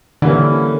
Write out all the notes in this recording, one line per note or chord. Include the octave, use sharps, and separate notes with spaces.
D3 E3 G3 A#3 C#4